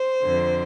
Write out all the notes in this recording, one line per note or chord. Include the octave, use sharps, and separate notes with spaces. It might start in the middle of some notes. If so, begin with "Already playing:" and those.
Already playing: C5
F2 D3